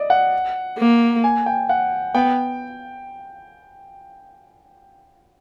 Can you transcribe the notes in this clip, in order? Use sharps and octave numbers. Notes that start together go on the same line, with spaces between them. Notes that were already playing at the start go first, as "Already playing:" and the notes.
Already playing: D5 D#5
F#5
A#3
G#5
G5
F#5
B3 G5